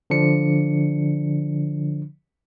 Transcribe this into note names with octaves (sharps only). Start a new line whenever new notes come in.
D3 F3 D4 C#7